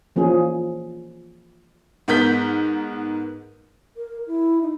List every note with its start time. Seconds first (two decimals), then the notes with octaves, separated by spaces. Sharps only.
0.16 E3 F3 A#3 C#4 G#4
2.08 G#2 B3 A#4 G6 B6
3.97 A#4
4.27 E4
4.62 D#4